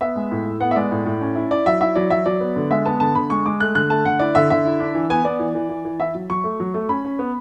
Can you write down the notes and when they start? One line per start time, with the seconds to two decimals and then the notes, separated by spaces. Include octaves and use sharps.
0.01 B3 E5
0.16 G#3
0.31 A2
0.46 A2
0.60 B3 F#5
0.71 E5
0.76 G#3 D5
0.91 A2
1.06 A2
1.21 C#4
1.36 E4
1.51 E4 D5
1.66 F#3 E5
1.81 E4 E5
1.96 F#3 D5
2.10 F#3 E5
2.26 F#3 D5
2.41 B3
2.56 D3
2.71 G#3 E5
2.85 B3 A5
3.00 D3 A5
3.15 D3 B5
3.30 G#3 C#6
3.46 G#3 D6
3.60 A3 F#6
3.75 D3 F#6
3.90 A3 A5
4.05 D3 F#5
4.19 E4 D5
4.35 D3 E5
4.50 D3 E5
4.65 E4
4.80 D4
4.95 E3
5.10 B3 G#5
5.24 B3 D5
5.39 E3
5.55 E3
5.69 E3
5.85 E3
5.99 E4 E5
6.15 F#3
6.30 F#3 C#6
6.44 A3
6.60 F#3
6.74 A3
6.89 C#4 B5
7.05 C#4
7.19 B3